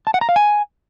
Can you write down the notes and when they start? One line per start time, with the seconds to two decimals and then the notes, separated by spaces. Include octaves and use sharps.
0.07 A5
0.14 F#5
0.21 A#5
0.29 F5
0.36 G#5